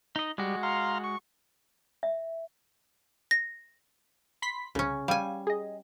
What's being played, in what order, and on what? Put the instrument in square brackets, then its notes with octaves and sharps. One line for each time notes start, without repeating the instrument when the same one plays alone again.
[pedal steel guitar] D#4 D#5
[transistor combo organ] G3 [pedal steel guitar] G#3 F#4
[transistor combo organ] F5 A#5 C6
C#6
[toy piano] E5
[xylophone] A#6
[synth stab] B5 C6 B6
[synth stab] C2 [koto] C#3 C#4
[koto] G3 G#5 [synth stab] F5
[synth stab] G#4 D#5